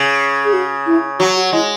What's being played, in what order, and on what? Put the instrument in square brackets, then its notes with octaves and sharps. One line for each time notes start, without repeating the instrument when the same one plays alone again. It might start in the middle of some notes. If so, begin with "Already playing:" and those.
Already playing: [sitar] C#3
[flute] G#4
F#4
E4
[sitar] F#3 [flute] F#4
[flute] F#4
[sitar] G#3 [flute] E4